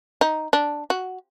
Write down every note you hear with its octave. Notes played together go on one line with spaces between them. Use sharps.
D#4
D4
F#4